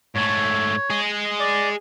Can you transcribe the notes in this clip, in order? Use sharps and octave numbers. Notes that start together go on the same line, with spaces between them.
G#2 A3 C#5
G#4 D#5
D5